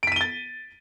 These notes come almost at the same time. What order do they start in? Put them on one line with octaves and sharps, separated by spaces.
D7 B6 D#7 G7 A6